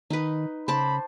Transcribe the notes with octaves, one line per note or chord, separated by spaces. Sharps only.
D#3 D#4 B4
C#3 C5 A5 B5 D6